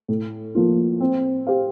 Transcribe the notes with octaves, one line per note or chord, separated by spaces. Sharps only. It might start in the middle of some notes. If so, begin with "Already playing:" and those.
A2
F3 A#3 F4
C4
G4 C5 F5